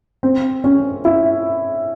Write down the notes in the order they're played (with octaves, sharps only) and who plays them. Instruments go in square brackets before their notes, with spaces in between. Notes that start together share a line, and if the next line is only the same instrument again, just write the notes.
[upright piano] C4
C#4
E4